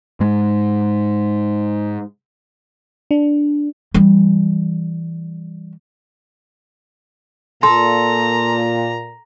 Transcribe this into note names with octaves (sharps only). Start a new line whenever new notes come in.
G#2 G#3
D4
E3 G3
A#2 A4 A#5 C6